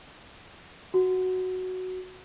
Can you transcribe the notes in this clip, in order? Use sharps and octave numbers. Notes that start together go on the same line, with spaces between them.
F#4